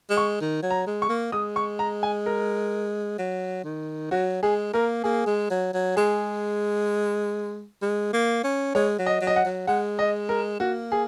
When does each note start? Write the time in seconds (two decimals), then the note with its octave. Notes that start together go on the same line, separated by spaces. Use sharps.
0.10 G#3
0.17 C#6
0.41 D#3
0.63 F#3
0.70 A#5
0.87 G#3
1.02 C#6
1.09 A#3
1.32 G#3 D#6
1.56 C#6
1.79 A#5
2.03 G#5
2.26 A#4
3.19 F#3
3.64 D#3
4.11 F#3 F#4
4.43 G#3 G#4
4.73 A#3 A#4
5.04 A#3 G#4
5.27 G#3
5.50 F#3
5.74 F#3
5.96 G#3 G#4
7.82 G#3
8.13 A#3
8.44 C#4
8.75 G#3 C#5
8.99 F#3
9.06 D#5
9.21 F#3
9.27 D#5
9.36 F#5
9.45 F#3
9.67 G#3 F#5
9.99 D#5
10.29 A#4
10.60 A#3 F#4
10.92 G#4